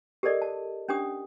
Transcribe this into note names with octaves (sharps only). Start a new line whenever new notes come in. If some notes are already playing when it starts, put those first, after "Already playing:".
G4 A4 A#4 D5 D#5
A5
C#4 D4 G4 D#6